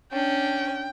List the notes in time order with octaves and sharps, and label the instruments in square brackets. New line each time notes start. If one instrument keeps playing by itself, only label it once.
[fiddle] C#4 [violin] D4 [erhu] G5